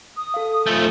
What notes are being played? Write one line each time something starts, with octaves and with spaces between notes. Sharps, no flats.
D#6
A4 F5
F3 A3 A6